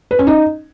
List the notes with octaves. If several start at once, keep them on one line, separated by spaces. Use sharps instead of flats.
B4
C#4
D#4